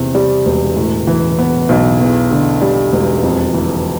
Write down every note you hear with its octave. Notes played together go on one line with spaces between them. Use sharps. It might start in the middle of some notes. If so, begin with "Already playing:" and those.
Already playing: E2 C3
G3
E1
A2
E3
B3
B1
E2
D3
G3
E1
F2
E3